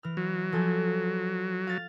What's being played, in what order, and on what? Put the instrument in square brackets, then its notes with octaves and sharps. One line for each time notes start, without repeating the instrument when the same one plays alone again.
[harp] E3 F6
[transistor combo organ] F#3
[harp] F3 A4 G#5
F5 A6